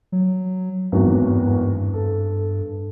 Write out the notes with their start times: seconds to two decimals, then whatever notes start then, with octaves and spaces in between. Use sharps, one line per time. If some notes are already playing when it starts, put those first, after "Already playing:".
0.12 F#3
0.92 G#1 E2 G2 F#3
1.94 A4